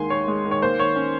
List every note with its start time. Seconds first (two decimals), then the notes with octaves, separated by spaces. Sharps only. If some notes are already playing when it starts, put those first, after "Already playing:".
Already playing: D#2 D#3 G#3 G#5 C6
0.10 D#2 C#5
0.28 G#3
0.45 D#3
0.51 C#5
0.62 A#3 C5
0.78 D#3 C#5
0.96 C#4